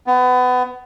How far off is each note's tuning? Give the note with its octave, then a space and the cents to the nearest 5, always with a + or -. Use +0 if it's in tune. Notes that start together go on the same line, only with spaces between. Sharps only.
B3 +25